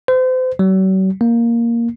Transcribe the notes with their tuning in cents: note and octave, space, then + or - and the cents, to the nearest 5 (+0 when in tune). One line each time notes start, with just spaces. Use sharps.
C5 -35
F#3 +45
A#3 +0